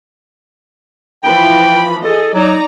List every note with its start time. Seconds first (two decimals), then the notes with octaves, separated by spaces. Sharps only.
1.24 E3 F3 G5 B5
2.04 G#4 A4 D#5
2.34 F#3 D#4 D5 A#5